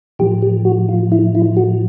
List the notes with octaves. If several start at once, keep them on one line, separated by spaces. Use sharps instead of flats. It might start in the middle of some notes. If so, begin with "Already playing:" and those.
A2 F3 G4
G4
F#4
F4
E4
E4
F#4